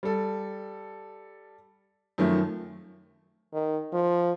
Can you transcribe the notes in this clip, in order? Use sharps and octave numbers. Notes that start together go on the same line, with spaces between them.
G3 A4
F#2 D#3 F3 A3
D#3
F3